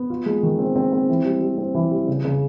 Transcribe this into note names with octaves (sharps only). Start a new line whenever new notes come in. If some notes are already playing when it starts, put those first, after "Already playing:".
Already playing: B3
F4
G#3
D#3
C4
C4
C4
E3
G3
G3
C4
E3
G3
C#3
C#3